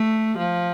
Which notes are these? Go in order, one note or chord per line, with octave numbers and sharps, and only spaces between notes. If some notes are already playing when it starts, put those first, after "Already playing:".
Already playing: A3
F3